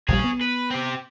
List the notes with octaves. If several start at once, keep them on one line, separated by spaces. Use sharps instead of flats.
A#1 F3 G3 G#4 C#5
B3
B4
C4 G4